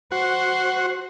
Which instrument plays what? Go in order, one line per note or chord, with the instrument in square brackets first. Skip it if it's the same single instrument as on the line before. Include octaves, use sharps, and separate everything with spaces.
[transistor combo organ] F#4 [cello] C5